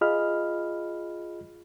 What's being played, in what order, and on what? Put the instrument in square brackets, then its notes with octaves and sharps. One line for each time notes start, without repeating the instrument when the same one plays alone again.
[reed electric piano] F4 G#4 D#5 B5 F6